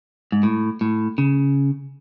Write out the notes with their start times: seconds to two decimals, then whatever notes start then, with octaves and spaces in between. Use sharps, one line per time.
0.32 G#2
0.43 A2
0.81 A2
1.18 C#3